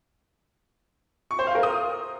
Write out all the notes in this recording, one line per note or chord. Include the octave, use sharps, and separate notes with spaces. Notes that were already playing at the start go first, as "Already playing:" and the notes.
C#6
C5
F5
A#4
D#6